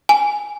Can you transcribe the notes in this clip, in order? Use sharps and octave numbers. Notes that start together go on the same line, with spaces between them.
G#5